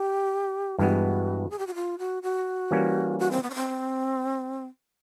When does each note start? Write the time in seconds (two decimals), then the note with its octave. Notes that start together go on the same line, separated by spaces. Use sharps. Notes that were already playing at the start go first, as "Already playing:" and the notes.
Already playing: G4
0.78 G2 E3 G#3 B3 F#4
1.51 G#4
1.59 G4
1.67 F#4
1.75 F4
1.99 F#4
2.23 F#4
2.71 E3 G3 A#3 C#4
3.19 F#4
3.31 C4
3.43 B3
3.50 C#4
3.55 C4